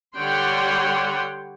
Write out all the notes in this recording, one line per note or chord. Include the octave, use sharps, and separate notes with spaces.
D3 G3 C#5 F#5 G5 C6